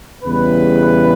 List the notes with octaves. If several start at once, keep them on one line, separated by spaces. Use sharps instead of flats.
E2 C#3 E3 G3 B4